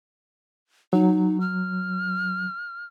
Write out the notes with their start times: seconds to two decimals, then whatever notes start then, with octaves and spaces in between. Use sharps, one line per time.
0.93 F#3 D#4
1.40 F6